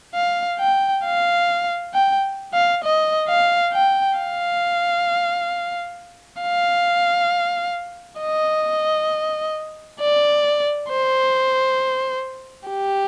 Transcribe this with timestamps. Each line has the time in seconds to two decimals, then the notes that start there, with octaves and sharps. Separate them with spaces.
0.15 F5
0.60 G5
1.04 F5
1.94 G5
2.53 F5
2.84 D#5
3.29 F5
3.73 G5
4.18 F5
6.42 F5
8.21 D#5
10.00 D5
10.90 C5
12.69 G4